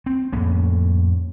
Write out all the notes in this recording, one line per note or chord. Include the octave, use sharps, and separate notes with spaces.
C4
F2 A2 A#3 C#4